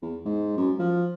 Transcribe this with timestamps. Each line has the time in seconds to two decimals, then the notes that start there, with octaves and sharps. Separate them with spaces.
0.02 E2
0.26 G#2
0.57 F#2
0.79 F3